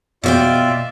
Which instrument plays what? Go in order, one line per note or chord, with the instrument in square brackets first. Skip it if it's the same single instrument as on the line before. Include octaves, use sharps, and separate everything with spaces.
[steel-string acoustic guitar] B2 C5 G5 [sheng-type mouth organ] F4 D5 E5